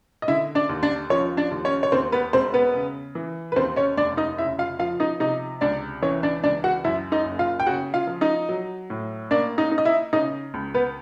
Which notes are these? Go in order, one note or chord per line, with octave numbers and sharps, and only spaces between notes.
D#5
D3 E4 E5
D4 D5
D#2
D4 D5
F3 C#4 C#5
D4 D5
D#2
C#4 C#5
C#5
D#2 C4 C5
B3 B4
E1 C4 C5
B3 B4
C#3
E3
B4
D#2 C4 C5
C#4 C#5
F1 D4 D5
D#4 D#5
C#3 E4 E5
F4 F5
F3 F4 F5
D#4 D#5
C3 D#4 D#5
C#2 D4 D5
E3 C#4 C#5
D4 D5
C#2 D4 D5
F#4 F#5
F#2 E4 E5
D#4 D#5
F#1
F4 F5
G5
C#3 F#4 F#5
F4 F5
F3
D#4 D#5
F#3
A2
A#3 D4 D5
D#4 D#5
D#4
D#5
E4 E5
C#3 D#4 D#5
C#2
B3 B4